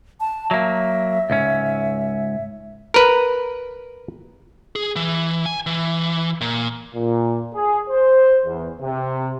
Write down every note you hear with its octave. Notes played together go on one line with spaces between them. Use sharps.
A5
F#3 A#3 E5
C#2 G#2 C#4
A#4 B4
G#4
E3
G#5
E3
A#2
A#2
G#4
C5
E2
C3